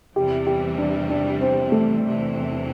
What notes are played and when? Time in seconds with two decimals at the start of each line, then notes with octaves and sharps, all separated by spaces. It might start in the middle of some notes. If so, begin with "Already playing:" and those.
0.15 E2 C3 E3 G3 G4
0.47 G4
0.78 D4
1.10 D4
1.41 C4
1.72 A3
2.04 E2 C3 E3